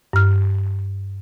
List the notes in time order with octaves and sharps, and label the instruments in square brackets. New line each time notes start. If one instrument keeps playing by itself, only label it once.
[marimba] G2 F6